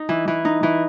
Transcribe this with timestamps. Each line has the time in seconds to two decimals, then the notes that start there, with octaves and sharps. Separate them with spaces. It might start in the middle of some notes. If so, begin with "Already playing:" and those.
Already playing: D#4
0.09 E3
0.28 E3
0.45 D#4
0.63 E3